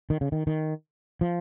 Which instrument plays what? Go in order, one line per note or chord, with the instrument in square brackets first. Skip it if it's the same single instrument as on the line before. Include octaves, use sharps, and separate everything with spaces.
[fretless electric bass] D#3
C#3
D#3
D#3
F3